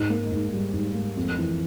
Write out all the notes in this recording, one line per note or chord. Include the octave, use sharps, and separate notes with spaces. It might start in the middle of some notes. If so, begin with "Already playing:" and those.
Already playing: G#2
A#3
G#2
G3
G#2
A#3
F2
E3